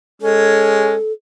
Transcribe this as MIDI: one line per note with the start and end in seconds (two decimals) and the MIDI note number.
0.22 0.95 56
0.22 0.95 61
0.22 1.12 69